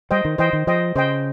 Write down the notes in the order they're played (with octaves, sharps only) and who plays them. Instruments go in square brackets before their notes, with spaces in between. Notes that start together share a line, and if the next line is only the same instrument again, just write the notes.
[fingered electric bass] G3 [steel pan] C5 D#5 G5
[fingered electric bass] D#3
[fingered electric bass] E3 [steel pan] C5 D#5 G5
[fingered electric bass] D#3
[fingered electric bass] F3 [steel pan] C5 D#5 G5
[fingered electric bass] C#3 [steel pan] C5 D#5 G5